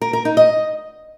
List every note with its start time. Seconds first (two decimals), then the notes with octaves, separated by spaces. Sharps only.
0.02 A#4
0.13 A#4
0.25 D#4
0.37 D#5